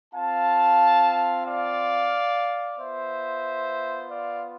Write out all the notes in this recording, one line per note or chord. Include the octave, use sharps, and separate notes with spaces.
C4 F4 F5 A5
D5 F5
B3 F4 C5 E5
D5 F5